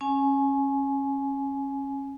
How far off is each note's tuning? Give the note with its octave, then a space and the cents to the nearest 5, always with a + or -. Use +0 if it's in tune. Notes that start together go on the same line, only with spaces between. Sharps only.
C#4 -25 G#5 +20